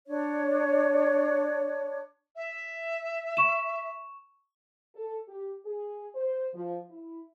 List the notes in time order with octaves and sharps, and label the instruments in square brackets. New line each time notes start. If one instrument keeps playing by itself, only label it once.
[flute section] D4 C#5
[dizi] E5
[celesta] C#6 E7
[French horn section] A4
G4
G#4
C5
F3
E4